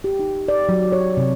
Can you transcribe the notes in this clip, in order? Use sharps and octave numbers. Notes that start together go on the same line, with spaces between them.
G4
D#4
D5
F#3
C#5
C3